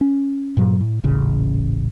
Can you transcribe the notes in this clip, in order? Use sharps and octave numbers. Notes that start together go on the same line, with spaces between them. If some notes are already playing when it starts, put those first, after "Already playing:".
C#4
G2 A#2 F#3
A2
D#1 A1 C#3